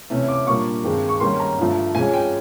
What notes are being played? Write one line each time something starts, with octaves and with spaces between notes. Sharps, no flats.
C3 E3 A3 C#4
D6
A#2 G3 A#3 D4 C#6
G2 D#3 G#3 C4
C#6
G#2 D#3 G3 A#3 C#4 C6
A#5
G2 D3 F3 A3
G#2 F3 G#3 C#4 G#5
G5